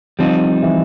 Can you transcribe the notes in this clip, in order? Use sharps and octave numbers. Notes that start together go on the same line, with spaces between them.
F3 G3 C4 D#4
E3